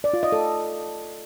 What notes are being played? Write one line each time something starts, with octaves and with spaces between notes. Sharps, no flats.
D5
F4
D#5
A4